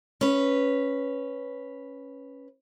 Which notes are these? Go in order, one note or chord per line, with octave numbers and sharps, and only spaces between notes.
C#4 B4